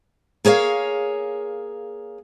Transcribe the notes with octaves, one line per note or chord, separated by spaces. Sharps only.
A#3 G#4 C#5 F5